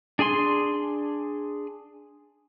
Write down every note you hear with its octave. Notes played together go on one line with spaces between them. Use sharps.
D4 G#4 G#5 C6